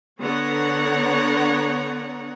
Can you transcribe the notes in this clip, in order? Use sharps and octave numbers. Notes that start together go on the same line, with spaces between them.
D3 B3 C#5 F#5 A#5